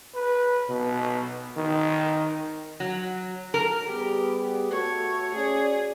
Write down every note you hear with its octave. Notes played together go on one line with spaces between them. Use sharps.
B4
B2
D#3
F#3
A#4
G3 B3 G4 G#4
A3 F#4 C#5
C#4 G#4 C#5 D5